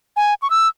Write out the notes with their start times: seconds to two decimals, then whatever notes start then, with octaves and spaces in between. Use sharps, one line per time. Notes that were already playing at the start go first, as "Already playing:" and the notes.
0.17 G#5
0.42 C#6
0.50 E6